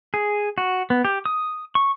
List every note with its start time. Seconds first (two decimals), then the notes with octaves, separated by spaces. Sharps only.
0.14 G#4
0.58 F#4
0.90 B3
1.05 G4
1.26 D#6
1.75 C#6